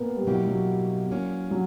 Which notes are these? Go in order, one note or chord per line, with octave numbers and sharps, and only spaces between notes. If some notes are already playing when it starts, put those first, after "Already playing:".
Already playing: A#2 A#3 B3
G3
B2 F#3 A#3 E4 G4
F#3
A#2 A#3 C#4
F#3